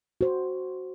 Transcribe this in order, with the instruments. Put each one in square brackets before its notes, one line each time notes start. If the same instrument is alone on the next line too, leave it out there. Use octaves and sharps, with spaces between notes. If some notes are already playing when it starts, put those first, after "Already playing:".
[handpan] F#4 C5